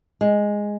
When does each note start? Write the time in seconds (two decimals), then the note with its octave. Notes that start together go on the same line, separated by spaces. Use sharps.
0.21 G#3